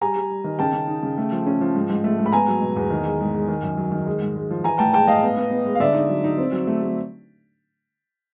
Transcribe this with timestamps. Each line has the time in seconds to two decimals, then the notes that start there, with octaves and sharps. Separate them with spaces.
0.01 G3 G#5 A#5
0.16 G3
0.30 G3
0.44 D#3
0.59 C#3 G5 A5
0.73 C#3
0.88 D#4
1.03 C#3
1.18 A3
1.32 F3
1.46 C#4
1.61 F3
1.75 G#2
1.90 G#2
2.04 A3
2.18 G#2
2.26 B5
2.32 B3 G#5 A#5
2.48 F#3
2.62 B2
2.76 E2
2.90 D#3
3.05 G#3
3.20 G#2
3.35 G#3
3.48 D#3
3.63 F#2
3.77 F#3
3.92 D#3
4.06 G#3
4.22 G#2
4.35 G#3
4.50 F3
4.64 E3 G#5 A#5
4.79 A2 G5 A5
4.93 G#3 G5 A5
5.07 A2 D#5 F5
5.23 B3
5.37 B3
5.51 B3
5.65 G#3
5.75 F5
5.80 D3 D5 E5
5.94 D#4
6.09 F#3
6.24 D#4
6.38 C4
6.52 F#3
6.67 A3
6.82 A3